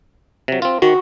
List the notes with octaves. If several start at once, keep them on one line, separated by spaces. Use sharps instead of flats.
C3 F#3
C4 F4
D#3 F#4